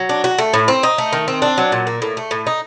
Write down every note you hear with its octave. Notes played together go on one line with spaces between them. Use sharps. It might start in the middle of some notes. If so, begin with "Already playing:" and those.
Already playing: F#3
D4
F#4
A3
A2
C4
D#4
A3
D#3
C4
D4
F#3
A#2
A#3
A2
A3
A2
D#4